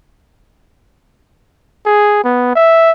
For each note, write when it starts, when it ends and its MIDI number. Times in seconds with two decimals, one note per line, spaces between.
1.86 2.23 68
2.24 2.53 59
2.55 2.92 76